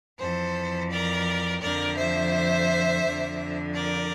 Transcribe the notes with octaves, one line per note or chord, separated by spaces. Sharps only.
F2 E3 A4 C5
A#4 D5
F2 D3 F3 A#4 D5
C5 E5
F2 D3 F3
A#4 D5